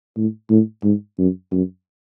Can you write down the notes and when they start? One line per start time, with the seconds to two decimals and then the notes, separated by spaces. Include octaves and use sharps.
0.17 A2
0.50 A2
0.83 G#2
1.18 F#2
1.52 F#2